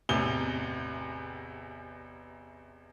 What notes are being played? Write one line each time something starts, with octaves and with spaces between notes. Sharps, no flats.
A1 E2 C3 G7